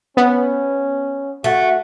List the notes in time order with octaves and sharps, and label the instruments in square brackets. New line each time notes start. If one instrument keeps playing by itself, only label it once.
[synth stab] B3 [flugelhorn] C#4
[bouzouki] A3 [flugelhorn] F#4